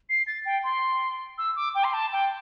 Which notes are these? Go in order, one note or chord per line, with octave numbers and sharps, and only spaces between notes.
C7
A6
G5
C6
E6
D6
G5
C6
A5
G5